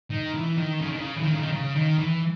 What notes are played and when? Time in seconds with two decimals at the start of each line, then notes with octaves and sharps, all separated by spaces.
0.10 D#3
0.34 E3
0.57 D#3
0.81 C#3
0.88 D#3
0.96 C#3
1.17 E3
1.23 D#3
1.32 C#3
1.39 D#3
1.52 C#3
1.75 D#3
1.99 E3